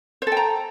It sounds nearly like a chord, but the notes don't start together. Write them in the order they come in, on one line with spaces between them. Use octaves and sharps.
C5 A4 G5 A#5